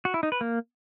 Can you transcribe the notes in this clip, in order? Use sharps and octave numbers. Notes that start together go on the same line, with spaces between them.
F#4
E4
D#4
B4
A#3